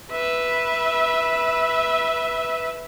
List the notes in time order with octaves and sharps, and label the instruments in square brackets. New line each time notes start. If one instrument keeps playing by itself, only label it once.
[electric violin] B4 E5